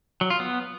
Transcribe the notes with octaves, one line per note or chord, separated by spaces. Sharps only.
F#3
F4
B3